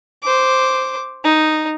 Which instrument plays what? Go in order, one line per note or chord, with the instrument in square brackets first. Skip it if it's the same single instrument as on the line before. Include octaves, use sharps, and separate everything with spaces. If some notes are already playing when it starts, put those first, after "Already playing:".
[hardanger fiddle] C5 D6
D#4